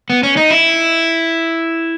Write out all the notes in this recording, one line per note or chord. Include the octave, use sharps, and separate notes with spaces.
B3
C#4
D#4
E4